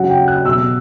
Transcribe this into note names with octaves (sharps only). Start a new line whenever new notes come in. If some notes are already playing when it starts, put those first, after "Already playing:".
Already playing: C#3 F#3 F#5
G5
F#6
B2 F#3 E6